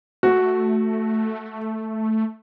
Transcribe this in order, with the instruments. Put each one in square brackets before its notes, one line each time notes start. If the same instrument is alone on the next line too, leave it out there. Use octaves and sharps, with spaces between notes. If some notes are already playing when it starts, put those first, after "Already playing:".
[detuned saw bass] A3 [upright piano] F#4